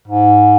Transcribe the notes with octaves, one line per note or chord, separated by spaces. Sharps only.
G#2